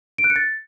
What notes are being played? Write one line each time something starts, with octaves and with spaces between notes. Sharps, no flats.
D7
F#6
C#7
A6